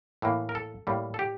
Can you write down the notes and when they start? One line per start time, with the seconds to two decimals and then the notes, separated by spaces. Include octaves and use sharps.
0.22 A2 E3 A#3
0.49 A#4
0.55 A4
0.87 A2 G3 A#3
1.14 A4
1.19 G4